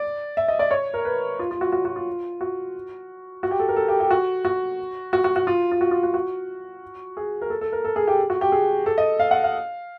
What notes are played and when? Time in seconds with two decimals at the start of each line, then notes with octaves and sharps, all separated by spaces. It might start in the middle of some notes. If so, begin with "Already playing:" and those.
Already playing: D5
0.37 E5
0.48 D#5
0.59 D5
0.71 C#5
0.94 A#4
1.05 B4
1.39 F4
1.51 F4
1.61 F#4
1.72 F#4
1.85 F#4
1.96 F4
2.41 F#4
3.43 F#4
3.51 G4
3.59 A4
3.69 A#4
3.76 A4
3.88 G4
4.00 G4
4.11 F#4
4.45 F#4
5.13 F#4
5.24 F#4
5.36 F#4
5.47 F4
5.72 F4
5.81 F#4
5.91 F4
6.03 F#4
6.14 F#4
7.17 G#4
7.42 A#4
7.50 A4
7.61 A4
7.72 A#4
7.85 A4
7.96 G#4
8.08 G4
8.30 F#4
8.41 G4
8.52 G#4
8.86 A4
8.98 D#5
9.20 F5
9.31 F#5
9.44 F5